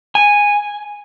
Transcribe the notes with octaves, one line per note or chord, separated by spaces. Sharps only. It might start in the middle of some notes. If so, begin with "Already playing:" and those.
G#5